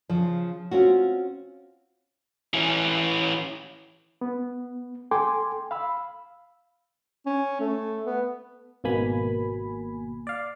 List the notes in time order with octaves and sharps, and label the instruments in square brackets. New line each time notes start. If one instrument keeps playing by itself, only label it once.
[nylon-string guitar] C#3 F3
C4 C#4 F4 F#4
[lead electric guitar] E3 C#4
[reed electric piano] B3
A4 G5 G#5 C6 D6
F5 B5 E6
[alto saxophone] C#4
A3
B3
[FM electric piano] G#1 B2 A#3 G#5 B5
D5 F5